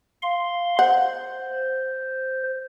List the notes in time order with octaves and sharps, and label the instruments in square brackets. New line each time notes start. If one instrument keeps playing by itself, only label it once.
[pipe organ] F5 C6
[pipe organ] C5 [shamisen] F#5